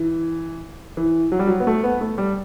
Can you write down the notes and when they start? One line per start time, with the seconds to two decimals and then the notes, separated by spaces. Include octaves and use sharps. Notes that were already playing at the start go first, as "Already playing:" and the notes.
Already playing: E3
0.97 E3
1.32 F#3
1.39 G3
1.47 F#3
1.60 B3
1.67 A3
1.84 B3
2.01 A3
2.18 G3